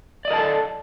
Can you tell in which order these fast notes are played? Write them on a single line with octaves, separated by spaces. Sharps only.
D5 D#5 A#4 A5 A4